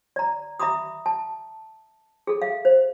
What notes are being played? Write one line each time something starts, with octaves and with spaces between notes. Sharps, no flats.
D5 A#5
E5 A#5 B5 D6 D#6
A5
G#4 A4
E5 F5
C5